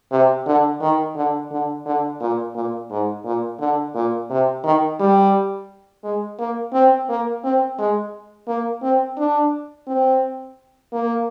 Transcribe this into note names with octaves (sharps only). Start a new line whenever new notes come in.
C3
D3
D#3
D3
D3
D3
A#2
A#2
G#2
A#2
D3
A#2
C3
D#3
G3
G#3
A#3
C4
A#3
C4
G#3
A#3
C4
D4
C4
A#3